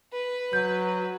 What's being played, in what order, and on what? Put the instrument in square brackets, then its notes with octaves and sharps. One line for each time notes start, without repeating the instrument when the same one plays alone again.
[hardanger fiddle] B4
[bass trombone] F#3 [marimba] G6